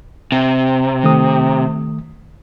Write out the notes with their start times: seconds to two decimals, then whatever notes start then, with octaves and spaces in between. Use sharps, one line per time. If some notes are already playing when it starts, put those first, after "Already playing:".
0.32 C3
1.04 D#3 A3 D#6